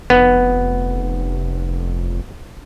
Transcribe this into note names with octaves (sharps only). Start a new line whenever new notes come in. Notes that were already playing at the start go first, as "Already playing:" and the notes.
F1 B3